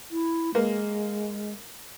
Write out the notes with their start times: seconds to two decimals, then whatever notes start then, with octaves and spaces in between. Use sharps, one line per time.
0.11 E4
0.55 G#3 A#3